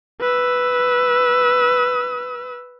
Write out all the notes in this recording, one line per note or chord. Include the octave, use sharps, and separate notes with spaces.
B4 E6